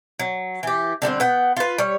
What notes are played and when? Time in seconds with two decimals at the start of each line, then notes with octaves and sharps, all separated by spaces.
0.19 F#3
0.63 E3 G4
1.02 D3 G3 B3 C4
1.20 B3 F#5 G5
1.57 F4 B4
1.78 G3 C#5